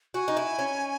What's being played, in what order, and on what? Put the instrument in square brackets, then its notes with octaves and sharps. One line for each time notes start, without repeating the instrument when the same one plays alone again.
[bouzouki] F#4 [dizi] G#5
[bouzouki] D#4
E4
C#4